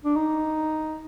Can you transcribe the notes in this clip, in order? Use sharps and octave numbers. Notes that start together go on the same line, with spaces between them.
D4
D#4